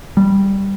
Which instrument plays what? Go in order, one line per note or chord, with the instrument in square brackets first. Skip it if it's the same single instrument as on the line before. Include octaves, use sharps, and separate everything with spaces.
[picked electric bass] G3